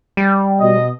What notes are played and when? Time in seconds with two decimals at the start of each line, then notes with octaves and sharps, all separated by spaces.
0.17 G3
0.61 B2 D#5